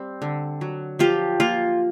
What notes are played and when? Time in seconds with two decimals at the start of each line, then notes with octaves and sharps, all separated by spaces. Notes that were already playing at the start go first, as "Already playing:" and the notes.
Already playing: G3 C4
0.22 D3
0.61 F#3
0.99 F3 F4 G4
1.40 A#3 F4